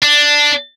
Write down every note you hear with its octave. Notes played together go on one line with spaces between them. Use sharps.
D4